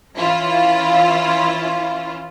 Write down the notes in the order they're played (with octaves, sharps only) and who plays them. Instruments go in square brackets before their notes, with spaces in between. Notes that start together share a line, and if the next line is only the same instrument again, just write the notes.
[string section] E3 C#4 E4 F4